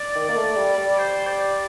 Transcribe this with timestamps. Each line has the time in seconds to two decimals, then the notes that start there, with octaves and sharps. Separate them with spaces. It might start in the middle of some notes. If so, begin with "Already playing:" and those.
Already playing: D5
0.15 D#3
0.29 A#3
0.36 A3
0.56 G3
0.77 G3
0.98 C5
1.27 D5